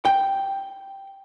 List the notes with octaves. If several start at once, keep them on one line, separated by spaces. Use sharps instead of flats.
G5